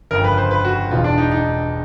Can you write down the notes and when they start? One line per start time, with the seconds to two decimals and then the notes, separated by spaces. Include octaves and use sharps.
0.11 G1 F2 C#3 A#4
0.24 B4
0.38 C5
0.51 B4
0.65 F#4
0.91 E1 E2 B2 F4
1.04 D4
1.18 D#4
1.32 D#4